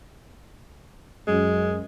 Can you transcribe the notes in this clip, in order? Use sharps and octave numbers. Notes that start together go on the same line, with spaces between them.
F#2 G#3